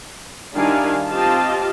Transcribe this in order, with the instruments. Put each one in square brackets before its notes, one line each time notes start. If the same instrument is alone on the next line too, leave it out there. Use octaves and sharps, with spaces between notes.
[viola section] D#3 G3 D4 E4 F5 G#5
C4 F4 G4 D#5 F5 A5